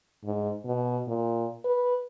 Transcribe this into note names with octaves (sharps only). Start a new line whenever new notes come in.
G#2
B2
A#2
B4